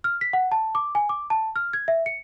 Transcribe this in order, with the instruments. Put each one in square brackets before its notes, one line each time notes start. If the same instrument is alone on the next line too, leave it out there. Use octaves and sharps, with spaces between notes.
[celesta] F6
B6
F#5
A5
D6
G#5
D6
A5
F6
G#6
E5
C#7